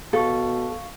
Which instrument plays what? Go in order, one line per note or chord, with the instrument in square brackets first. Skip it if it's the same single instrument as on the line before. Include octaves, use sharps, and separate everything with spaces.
[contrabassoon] B2 [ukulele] A4 [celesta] F5 C#6